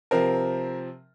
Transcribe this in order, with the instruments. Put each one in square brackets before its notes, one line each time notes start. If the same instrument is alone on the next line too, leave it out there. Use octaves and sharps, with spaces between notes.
[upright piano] C3 F3 C4 A#4